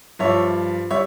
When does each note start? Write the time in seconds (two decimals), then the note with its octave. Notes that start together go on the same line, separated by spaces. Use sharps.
0.19 G2 F3 C#5 E5
0.91 G3 C#5 E5